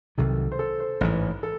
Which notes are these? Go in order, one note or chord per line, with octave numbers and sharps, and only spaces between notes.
C2 C3 D#3 F#3 A4
C5
A4
C5
A1 G#2 E3
A4